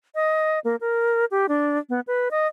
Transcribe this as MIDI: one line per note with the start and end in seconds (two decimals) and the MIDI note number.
0.15 0.59 75
0.64 0.76 58
0.81 1.25 70
1.31 1.46 67
1.49 1.78 62
1.89 2.00 59
2.07 2.29 71
2.31 2.47 75